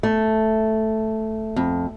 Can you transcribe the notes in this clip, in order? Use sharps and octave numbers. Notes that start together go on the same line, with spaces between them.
A3
F2